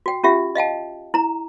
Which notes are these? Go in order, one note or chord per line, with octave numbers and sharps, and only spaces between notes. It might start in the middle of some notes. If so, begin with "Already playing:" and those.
F#4 G5
C#4 F4 G4 E5
D#5 F5 G5 A5
E4 A#5